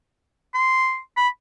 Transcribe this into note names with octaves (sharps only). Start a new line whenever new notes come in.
C6
B5